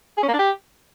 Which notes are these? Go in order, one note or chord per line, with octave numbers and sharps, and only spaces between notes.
G#4
C#4
A#3
D4
G4